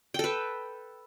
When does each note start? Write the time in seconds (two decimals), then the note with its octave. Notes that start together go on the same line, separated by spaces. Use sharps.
0.14 G5
0.19 A4
0.24 B4